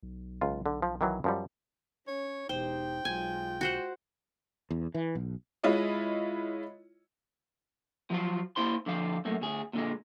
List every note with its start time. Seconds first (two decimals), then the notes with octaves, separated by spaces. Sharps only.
0.03 B1
0.41 C#2 F4
0.66 D3
0.82 F3
1.01 D#3 E3 F#3
1.24 F#2 F3 G3
2.08 C#4 C#5
2.49 E1 D#4 G4 C5 G5
3.05 B1 G#3 F4 G#5
3.61 F#4 C5 F#5
4.71 E2
4.94 E3
5.15 B1
5.63 G#3 E4 F4 C#5 D#5
8.10 F3 F#3 F4
8.56 A#3 E4 C5 C6
8.86 D3 F3 F5
9.25 F#2 A3 A#3
9.41 D2 G#4
9.73 A#2 D3 G#3